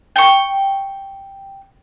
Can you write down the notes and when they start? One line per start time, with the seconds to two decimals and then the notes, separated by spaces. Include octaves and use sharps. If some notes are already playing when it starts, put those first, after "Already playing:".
0.16 G5 C#6